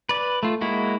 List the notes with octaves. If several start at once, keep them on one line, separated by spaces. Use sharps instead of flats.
B4 D5
A3 F4
G#3 A#3 E4 F#4